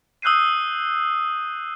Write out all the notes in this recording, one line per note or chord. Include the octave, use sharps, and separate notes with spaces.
D#6 E6 F#6 G6 C7 D#7